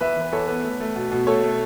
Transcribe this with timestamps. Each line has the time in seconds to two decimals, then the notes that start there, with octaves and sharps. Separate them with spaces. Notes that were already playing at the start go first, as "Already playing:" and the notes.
0.01 E2 B4 E5
0.16 E3 B4
0.32 E2 A4 C#5
0.48 B3 B4
0.64 A3
0.80 A3
0.96 B2
1.12 B2
1.27 A3 A4 C#5
1.43 A3